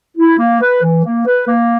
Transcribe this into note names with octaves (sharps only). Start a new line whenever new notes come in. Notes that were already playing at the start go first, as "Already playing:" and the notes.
E4
A#3
B4
E3
A#3
B4
A#3